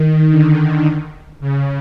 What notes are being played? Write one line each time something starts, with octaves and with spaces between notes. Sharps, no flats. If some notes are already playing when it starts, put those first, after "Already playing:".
Already playing: D#3
D3
C#3